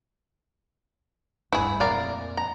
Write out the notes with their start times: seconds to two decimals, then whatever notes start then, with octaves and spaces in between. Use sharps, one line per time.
1.52 D1 G2 E4 G#4
1.80 F2 A#2 A#4 D5 F5
2.37 A#5